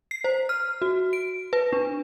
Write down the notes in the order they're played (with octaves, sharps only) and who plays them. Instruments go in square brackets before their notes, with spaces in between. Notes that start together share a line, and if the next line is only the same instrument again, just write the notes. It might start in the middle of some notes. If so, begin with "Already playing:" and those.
[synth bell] C7
C5
F6
F#4
D7
B4
D4